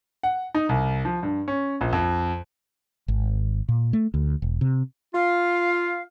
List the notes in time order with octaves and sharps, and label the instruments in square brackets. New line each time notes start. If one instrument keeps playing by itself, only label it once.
[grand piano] F#5
D#4
C2
F3
G2
C#4
A#1
F2
[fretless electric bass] G#1
A#2
A3
D2
E1
C3
[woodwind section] F4 F5